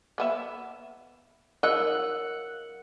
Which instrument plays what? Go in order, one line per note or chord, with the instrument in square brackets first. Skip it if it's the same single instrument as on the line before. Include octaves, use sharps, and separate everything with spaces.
[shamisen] A#3 B3 E5
[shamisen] F#3 D#4 D#5 [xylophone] A#4 E6 F#6 [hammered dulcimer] F#5